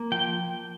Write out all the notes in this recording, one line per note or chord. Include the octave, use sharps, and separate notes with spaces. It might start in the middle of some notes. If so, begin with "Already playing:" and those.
Already playing: A#3
F3 G5